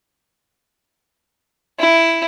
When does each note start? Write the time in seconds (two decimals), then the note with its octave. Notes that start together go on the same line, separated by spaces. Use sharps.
1.79 E4